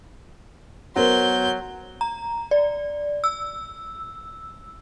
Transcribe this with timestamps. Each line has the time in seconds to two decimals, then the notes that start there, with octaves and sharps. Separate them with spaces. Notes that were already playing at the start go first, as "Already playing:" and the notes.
0.96 F#3 B3 A#4 C5 C6 G6
2.01 A#5
2.51 D5
3.24 E6